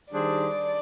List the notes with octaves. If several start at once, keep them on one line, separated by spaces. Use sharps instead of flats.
D#3 G3 D4 G#4 C5 D5